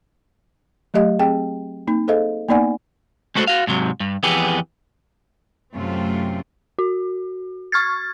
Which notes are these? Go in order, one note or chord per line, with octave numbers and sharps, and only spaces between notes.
F#3 A3 G4 D#5 F5
C4 G#4 G5
A#3 C4 D#4
G#4 A4 C5 D#5 F5
A#3 B3 D#4 D5 F#5 G#5
G#3 A3 B3 F#4 A4 C5
F#4 F5
G#2 C3 F#3
G2
F2 E3 B3 G4 G#4
F#2 C3 A3 C4 F4
F#4
C#6 F6 G#6 A6